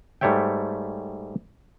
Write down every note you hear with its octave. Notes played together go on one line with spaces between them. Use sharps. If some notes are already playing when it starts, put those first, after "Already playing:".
G#2 G3 A3 C#5 E5 G5